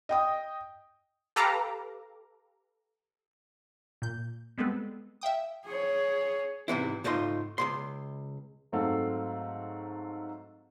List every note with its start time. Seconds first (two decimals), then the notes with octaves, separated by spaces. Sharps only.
0.09 D#5 G5 D#6
1.36 G4 A4 B4 F5 A#5 D6
4.02 A#2 G6
4.58 G3 G#3 B3 C4 A4 B4
5.21 E5 F5 G5 D#6
5.65 G#4 C#5
6.68 G#2 C3 E3 E4
7.04 C#2 G#2 A3 D#4 F4 C6
7.58 C#2 G2 C6
8.72 G#2 F#3 A3 C4 A4 F5